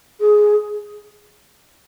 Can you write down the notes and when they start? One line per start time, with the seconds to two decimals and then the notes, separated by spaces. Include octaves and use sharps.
0.20 G#4